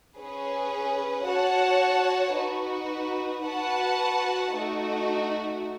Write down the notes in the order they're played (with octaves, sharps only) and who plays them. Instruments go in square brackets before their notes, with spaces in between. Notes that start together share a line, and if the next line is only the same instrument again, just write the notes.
[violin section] C#4 G#4 B4
F#4 C#5 F#5 A5
D#4 F#4 B4
F#4 B4 F#5 A5
A3 D#4 F#4